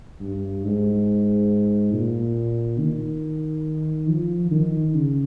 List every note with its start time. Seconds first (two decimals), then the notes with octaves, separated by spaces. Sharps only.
0.21 G2
0.64 G#2
1.93 A#2
2.79 D#3
4.08 F3
4.51 D#3
4.94 C#3